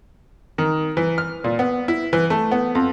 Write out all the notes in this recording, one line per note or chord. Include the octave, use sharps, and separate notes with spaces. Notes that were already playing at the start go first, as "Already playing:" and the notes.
D#3
E3
F6
A#2
B3
E4
E3
A3
B3
F2